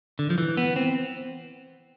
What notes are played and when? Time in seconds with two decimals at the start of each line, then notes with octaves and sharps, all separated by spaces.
0.19 D3
0.30 F3
0.38 E3
0.57 B3
0.76 C4